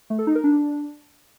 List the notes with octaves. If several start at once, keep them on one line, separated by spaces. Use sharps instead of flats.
A3
A4
D#4
A#4
D4